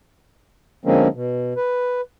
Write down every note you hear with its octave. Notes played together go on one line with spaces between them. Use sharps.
D3 F3 G#3 A#3 C4 C#4
B2
B4